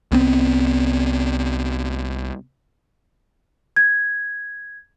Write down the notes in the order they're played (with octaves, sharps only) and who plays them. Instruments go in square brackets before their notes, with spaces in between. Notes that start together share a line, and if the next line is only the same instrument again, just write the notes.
[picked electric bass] C2 B3 C4
[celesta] G#6